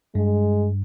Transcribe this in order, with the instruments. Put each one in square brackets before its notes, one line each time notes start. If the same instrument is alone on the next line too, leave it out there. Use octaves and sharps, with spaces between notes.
[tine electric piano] G2 [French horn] G#3